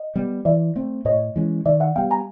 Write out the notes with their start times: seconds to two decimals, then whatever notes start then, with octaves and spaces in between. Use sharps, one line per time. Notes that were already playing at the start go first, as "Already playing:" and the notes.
Already playing: D#5
0.16 G3 B3
0.45 E3 D5 E5
0.76 A3 C4
1.05 A2 C#5 D#5
1.36 E3 G#3 C#4
1.65 D#3 D5 E5
1.80 E5 F#5
1.96 G3 B3 F5 G5
2.11 G#5 A#5